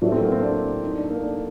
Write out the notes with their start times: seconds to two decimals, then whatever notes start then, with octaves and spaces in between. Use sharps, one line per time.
0.01 A2 F#3 A3 D4
0.12 C4
0.22 A#3
0.32 C4
0.42 D4
0.83 D#4
0.97 D4
1.10 A#3
1.23 D4